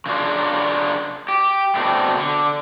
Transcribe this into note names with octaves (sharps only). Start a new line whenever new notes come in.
C#3 A#3 D4 F4
G4
B2 A3 C4 D4
D3